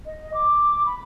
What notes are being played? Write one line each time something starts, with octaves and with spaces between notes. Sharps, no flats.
D#5
D6
B5